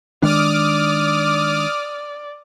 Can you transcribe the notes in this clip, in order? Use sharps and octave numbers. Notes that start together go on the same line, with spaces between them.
D#3 G#3 D4 D5 D6 D#6 F6